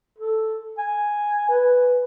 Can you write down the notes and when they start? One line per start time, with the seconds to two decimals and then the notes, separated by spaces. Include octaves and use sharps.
0.18 A4
0.78 G#5
1.49 B4